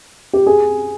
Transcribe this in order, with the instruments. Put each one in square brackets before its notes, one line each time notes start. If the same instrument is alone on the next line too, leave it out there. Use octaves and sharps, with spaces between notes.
[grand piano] G4
G#4